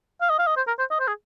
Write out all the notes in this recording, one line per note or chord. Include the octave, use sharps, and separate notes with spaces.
F5
D#5
F5
D#5
C5
A#4
C5
D#5
C5
G#4